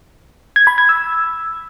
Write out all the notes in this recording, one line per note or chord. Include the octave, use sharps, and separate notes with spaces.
G#6
B5
G#6
E6